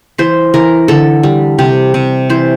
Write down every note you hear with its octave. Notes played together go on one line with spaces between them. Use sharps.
E3 C5
E3 A#4
D3 A4
G3
C3 G4
C3
E3 C5